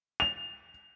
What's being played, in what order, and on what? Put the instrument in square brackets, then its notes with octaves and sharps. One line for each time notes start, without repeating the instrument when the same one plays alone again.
[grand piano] F7